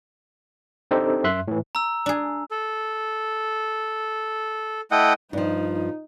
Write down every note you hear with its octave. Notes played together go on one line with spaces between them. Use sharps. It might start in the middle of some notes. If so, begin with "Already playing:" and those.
C4 D4 D#4 G4 A4 C5
F#2 E5 C6 F#6
A2 E3
A#5 E6
D4 G#4
A4
A3 E4 D#5 F#5 G5
G2 F3 D#4